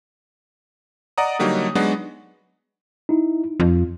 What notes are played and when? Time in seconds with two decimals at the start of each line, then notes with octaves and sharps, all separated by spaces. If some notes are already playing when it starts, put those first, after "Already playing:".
1.18 D5 D#5 F#5 A#5 D#6
1.39 D3 F#3 G3 A#3 D#4 C#5
1.75 F#3 G#3 B3 D4 D#4 F#4
3.09 D#4 E4
3.60 F2 F4